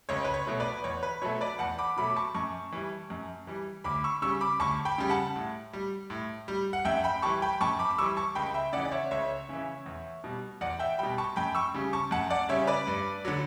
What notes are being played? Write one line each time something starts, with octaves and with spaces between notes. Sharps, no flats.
C#2 C#5
B4
C#5
B2 F#3 A3
B4 D5
E2 C#5
B4
B2 F#3 A3 C#5
B4 D5
E2 F#5 A5
B5 D6
B2 F#3 A3 B5 D6
D6
A5 C#6
F#2 A5 C#6
E3 G3
F#2
E3 G3
D2 B5 D6
C#6 E6
C#3 G3 C#6 E6
B5 D6
D2 A5 C#6
G5 B5
C#3 G3
F#5 A5
A2
G3
A2
G3
F#5
F#2 E5 G5
G5 B5
E3 G3 A5 C#6
G5 B5
F#2 A5 C#6
B5 D6
D6
E3 G3 C#6 E6
A5 C#6
C#2 G5 B5
E5 G5
C#3 E3 D5 F#5
D5
C#5 E5
C#2 C#5 E5
C#3 E3
E2
B2 G3
E2 D5 F#5
E5 G5
B2 G3 G5 B5
A5 C#6
F#2 G5 B5
C#6 E6
C#3 G3
A5 C#6
F#2 F#5 A5
D5 F#5
C#3 G3 C#5 E5
B4 D5
G2
D3 F#3